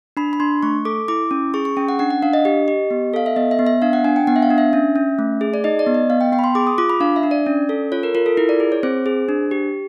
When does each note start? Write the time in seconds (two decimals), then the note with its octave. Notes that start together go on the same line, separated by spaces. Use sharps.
0.17 D4 B5
0.33 B5
0.40 D4 C6
0.63 A3 C#6
0.85 A4 D6
1.08 E4 D6
1.31 C#4
1.54 G#4 C#6
1.65 C#6
1.77 C#4 G5
1.89 F#5
1.99 D4 F#5
2.10 F#5
2.22 D4 F5
2.33 D#5
2.45 G4 D#5
2.68 G4
2.91 B3
3.13 A4 F5
3.26 E5
3.36 B3 D#5
3.51 E5
3.59 B3
3.67 E5
3.82 D4 F5
3.93 F#5
4.04 D4 G#5
4.16 G5
4.27 B3 F#5
4.36 E5
4.42 F5
4.50 D4
4.58 E5
4.73 C#4
4.96 C#4
5.19 A3
5.41 G#4
5.54 D5
5.64 D#4 D#5
5.79 D5
5.87 B3
5.94 D#5
6.10 B3 F5
6.21 G5
6.32 B3 G5
6.39 B5
6.44 C6
6.55 G#4 D6
6.67 D#6
6.78 F4 D6
6.90 B5
7.00 D4 F5
7.16 E5
7.23 D4
7.31 D5
7.46 C#4
7.69 A4
7.92 F4 C#5
8.03 A#4
8.15 F4 A#4
8.26 A4
8.37 E4 A#4
8.49 D5
8.60 G#4
8.72 C#5
8.83 C4 C5
9.06 G#4
9.29 D4
9.51 G4